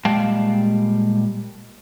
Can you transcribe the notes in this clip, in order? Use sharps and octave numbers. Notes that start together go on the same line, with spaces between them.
A#2 G3 G#3 F5 G5 A5